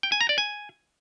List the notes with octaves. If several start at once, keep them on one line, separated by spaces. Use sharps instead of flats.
G5
G#5
A#5
D5
G#5